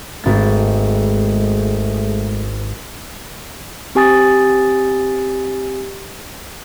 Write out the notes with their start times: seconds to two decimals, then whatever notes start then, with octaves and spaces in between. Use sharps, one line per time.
0.24 G#1 G#3 A3 A6
3.95 C4 G4 G#5 D#6 A6